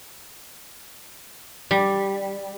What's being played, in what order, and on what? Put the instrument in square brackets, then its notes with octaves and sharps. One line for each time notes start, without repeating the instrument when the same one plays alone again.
[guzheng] G3